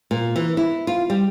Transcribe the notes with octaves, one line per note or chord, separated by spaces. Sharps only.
A#2
E3
E4
F4
G3